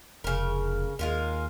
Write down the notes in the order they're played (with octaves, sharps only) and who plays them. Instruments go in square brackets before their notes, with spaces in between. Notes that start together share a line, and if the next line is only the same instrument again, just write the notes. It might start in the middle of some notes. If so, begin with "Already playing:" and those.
[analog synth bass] F1 [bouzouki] C#3 A#4
[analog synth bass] D#2 [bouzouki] G#3 F4 A#4